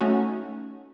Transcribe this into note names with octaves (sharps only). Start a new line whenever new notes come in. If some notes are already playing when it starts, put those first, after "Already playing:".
A3 C#4 D#4 F#4